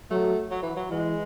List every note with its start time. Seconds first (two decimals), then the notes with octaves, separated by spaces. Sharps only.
0.11 F#3 A3
0.51 F#3
0.63 E3
0.76 F#3
0.90 E3 G#3